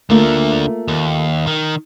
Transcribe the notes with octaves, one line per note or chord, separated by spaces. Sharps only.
D2 D3 A3 A#3 F4
D#2
D#3